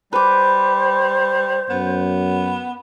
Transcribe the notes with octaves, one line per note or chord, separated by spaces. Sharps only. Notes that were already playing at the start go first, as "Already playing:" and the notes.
G3 B4 C5 D6
F#2 B3